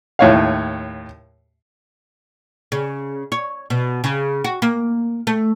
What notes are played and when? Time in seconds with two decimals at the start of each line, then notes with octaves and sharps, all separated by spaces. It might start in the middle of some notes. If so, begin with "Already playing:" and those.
0.19 D#2 A2 C#5 F5
2.72 C#3
3.32 C#5
3.70 B2
4.04 C#3
4.44 F#4
4.62 A#3
5.27 A3